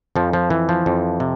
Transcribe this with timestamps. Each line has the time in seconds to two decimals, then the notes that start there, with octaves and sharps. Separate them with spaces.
0.16 F2 F3
0.33 F3
0.50 E3
0.69 F3
0.86 F2
1.20 C3